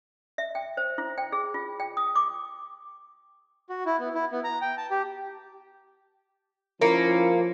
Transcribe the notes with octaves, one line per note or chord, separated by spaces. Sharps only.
E5
G5
C5
E4
G5
G#4
F4
G5
D#6
D6
F#4
E4
B3
E4
B3
A#5
G5
A5
G4
F3 A#3 C#4 E4 A#4 C#7